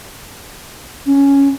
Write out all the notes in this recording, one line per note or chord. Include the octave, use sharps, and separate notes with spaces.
C#4